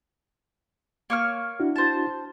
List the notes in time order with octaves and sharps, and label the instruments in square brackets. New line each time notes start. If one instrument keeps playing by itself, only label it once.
[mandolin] A#3 C#5 F6
[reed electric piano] D4 E4 F#4
[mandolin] C5 A5